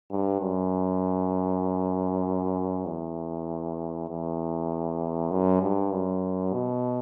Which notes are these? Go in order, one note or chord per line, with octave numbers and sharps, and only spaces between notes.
G2
F#2
E2
E2
F#2
G2
F#2
B2